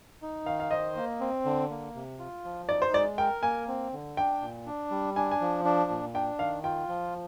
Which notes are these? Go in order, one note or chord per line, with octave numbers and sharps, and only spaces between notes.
D#4
D#3 F5
F5
C5 D#5
A#3
C4
D3
A#3
C3
F4
F3
D#4 D5
C5
G#3 D5
A#4 G5
A#3 G#5
C4
D3
D4 G5
A#2
D4
G3
D4 G#5
G#5
F3
D4
A#2
D4 G5
D#3 F5
F4 G5
F3